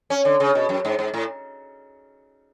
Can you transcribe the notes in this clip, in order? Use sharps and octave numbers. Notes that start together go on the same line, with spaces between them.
C#4
D3
C#3
B2
F#2
G#2
G#2
A2